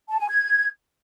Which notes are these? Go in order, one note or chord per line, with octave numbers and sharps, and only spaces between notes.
A5
G#5
G#6